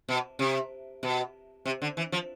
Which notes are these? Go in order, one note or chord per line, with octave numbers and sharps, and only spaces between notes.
B2
C3
B2
C3
D3
E3
F3